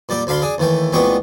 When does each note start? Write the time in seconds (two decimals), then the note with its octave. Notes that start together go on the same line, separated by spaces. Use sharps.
0.09 A#2 G3 D5
0.27 D2 D4 F5 B5 C6
0.42 D4 G#4
0.58 D#2 E3 A3 G5
0.93 C2 A#2 G#3 B3 G5 C#6